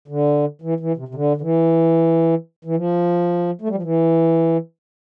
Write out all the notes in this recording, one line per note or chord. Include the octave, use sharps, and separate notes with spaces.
D3
E3
E3
C3
C3
D3
D3
E3
E3
F3
A3
G3
F3
E3